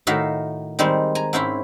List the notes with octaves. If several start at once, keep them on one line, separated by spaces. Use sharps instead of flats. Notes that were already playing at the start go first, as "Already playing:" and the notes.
A2 D#3 F#4 A#4 E5 F5
D#3 G3 G#3 C4
G#5 A#5
G#2 C4 C#4 E4